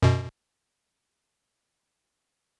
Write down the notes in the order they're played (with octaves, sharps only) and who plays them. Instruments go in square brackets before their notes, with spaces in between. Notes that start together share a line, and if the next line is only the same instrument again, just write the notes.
[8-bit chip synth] F#2 B2